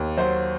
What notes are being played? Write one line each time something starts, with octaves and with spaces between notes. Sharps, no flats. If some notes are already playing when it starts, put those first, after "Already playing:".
Already playing: D#2
F#3 C5